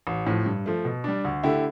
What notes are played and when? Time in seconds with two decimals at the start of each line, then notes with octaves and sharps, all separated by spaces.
0.07 A1
0.26 A2 F3
0.46 G2
0.66 F3 A3
0.85 B2
1.04 G3 D4
1.25 D2
1.43 D3 A3 E4 G4